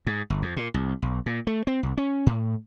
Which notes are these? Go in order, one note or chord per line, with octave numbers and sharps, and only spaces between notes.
G#2
G1
F2
A#2
C2
B1
A#2
A3
C4
C2
C#4
A2